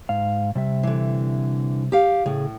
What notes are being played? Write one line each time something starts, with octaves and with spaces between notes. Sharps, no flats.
G#2 F5
C3 G3 E5
D3 E3
G4 F5
A2 C#3 G#4